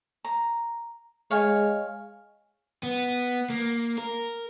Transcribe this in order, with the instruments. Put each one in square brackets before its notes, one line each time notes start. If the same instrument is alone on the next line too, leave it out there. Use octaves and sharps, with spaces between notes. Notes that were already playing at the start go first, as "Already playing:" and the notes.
[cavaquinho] A#5
[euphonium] G#3 [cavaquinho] C#5 F5 G#5
[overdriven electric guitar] B3
A#3
A#4